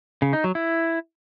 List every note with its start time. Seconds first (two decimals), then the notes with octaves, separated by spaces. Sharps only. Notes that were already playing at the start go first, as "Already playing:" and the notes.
0.22 C#3
0.33 D#4
0.44 F#3
0.55 E4